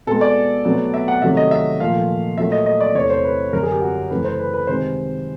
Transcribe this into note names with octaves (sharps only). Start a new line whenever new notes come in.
B2 G#3 A4
D5
B2 F#3 A3
E5
F#5
C3 D#3 F#3 A3 E5
D#5
E5
A#2 F3 A3 F5
A#2 F#3 A3 E5
D#5
D#5
D5
E2 C3 E3 A3 C#5
C5
B4
F#2 D3 G3 A#4
G#4
G4
F#4
F#2 C#3 E3 A3 B4
C5
B4
B4
C3 D#3 G#3 C5